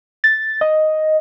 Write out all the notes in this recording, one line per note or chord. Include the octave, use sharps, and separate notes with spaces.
A6
D#5